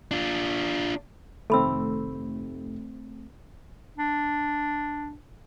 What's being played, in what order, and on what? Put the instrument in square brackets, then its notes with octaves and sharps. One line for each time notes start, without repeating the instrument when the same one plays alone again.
[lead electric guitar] D4 F4
[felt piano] F1 D#3 [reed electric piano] A3 C4 [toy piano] A4 B5 E6
[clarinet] D4